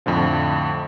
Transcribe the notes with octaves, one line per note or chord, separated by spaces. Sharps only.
F2 A2 D3 F3